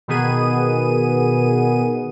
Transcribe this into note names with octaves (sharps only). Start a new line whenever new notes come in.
B2 D#3 B3 G#4 D#7